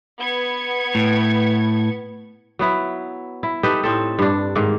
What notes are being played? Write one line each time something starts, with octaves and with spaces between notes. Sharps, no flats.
B3 G#6 C#7
A2
F#3 B3 E4
E4
D#4 G4 A4 B4
A2 C4 A4
G2 D4
G#2 D#3 A#3